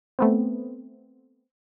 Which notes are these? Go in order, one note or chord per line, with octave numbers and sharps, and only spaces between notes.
A3 B3 C4